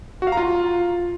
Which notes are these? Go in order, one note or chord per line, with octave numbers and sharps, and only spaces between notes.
F#4
F5
A#5
F4